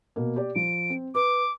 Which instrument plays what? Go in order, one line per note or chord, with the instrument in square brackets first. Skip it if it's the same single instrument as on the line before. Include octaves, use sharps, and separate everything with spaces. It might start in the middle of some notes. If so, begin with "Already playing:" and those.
[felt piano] B2 A#3
G4 D5
[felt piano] F3 [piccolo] D7
[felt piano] C4
[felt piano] B4 [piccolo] D6